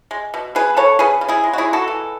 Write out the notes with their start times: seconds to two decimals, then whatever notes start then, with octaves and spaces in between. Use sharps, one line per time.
0.11 G#3
0.34 B2
0.55 B3 G#4 B4
0.76 C#3 A4 C#5
0.99 C#3 G#4 B4
1.21 C#3
1.29 E4 G#4
1.44 G#3
1.53 F#4
1.58 E4 G#4
1.65 G#3
1.73 F#4 A4
1.88 E3